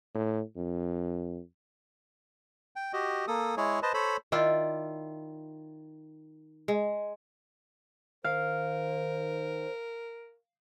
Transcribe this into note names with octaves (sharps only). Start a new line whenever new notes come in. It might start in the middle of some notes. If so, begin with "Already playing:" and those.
A2
F2
G5
F#4 G4 D#5
A#3 A4 D#6
G#3 E4 G#4 C#5
B4 C5 D#5 A5
A4 C5 C#5 B5
D#3 E4 F4 D5
G#3
D#3 A#4 C5 F5